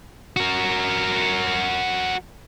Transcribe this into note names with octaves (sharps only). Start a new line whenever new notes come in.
F#4 A#4